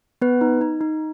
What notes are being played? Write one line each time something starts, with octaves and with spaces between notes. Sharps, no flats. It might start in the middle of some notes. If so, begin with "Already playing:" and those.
B3 B4
D#4
D#4
D#4